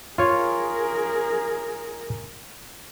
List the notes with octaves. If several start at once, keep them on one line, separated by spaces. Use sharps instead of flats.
F4 G#4 A#4 C#5